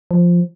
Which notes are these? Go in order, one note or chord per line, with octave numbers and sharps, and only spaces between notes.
F3